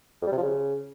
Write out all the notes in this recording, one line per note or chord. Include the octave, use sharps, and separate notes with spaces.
F2
G3
C3
F3
C#3